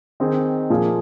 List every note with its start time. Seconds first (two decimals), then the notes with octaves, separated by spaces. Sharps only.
0.20 D#3 C4 D#4 G#4
0.70 A#2 F3 A#3 G#4